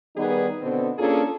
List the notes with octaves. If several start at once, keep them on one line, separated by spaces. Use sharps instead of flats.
D#3 G3 B3 D#4 G#4 B4
B2 D3 B3 C4
A#3 C#4 D4 F4 G#4 A4